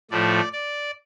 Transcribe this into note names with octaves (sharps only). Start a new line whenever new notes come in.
A2 F3 A3 D5
D5